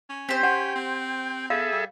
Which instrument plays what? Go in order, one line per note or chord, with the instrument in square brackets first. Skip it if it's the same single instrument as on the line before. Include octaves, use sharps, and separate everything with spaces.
[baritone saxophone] C#4
[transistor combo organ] C4 [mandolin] G4 C5
[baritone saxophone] C#4 [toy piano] F#5 [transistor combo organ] G5
[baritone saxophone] C4
[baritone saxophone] B3 [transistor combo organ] G#4 A4 E5 [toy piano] F5
[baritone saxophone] G3